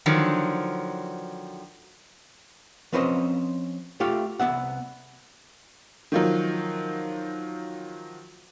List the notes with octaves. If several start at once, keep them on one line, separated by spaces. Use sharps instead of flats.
D3 D#3 F3 F#3
F3 C4 C#4 B4 C5 D#5
A3 F4 G4 F5
C2 B3 E5 F#5
D#3 F3 F#3